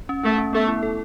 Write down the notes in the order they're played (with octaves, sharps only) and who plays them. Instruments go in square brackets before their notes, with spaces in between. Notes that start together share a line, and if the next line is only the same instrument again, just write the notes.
[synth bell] C#4
[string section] A3 [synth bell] C#4
[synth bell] C#4
[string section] A3 [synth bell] B3
[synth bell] E4
A4